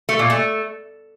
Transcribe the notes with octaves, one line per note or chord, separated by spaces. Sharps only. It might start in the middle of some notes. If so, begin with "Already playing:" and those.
A3
A#2
A3